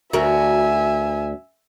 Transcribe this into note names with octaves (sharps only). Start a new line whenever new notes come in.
D2 F#4 A#4 E5 G#5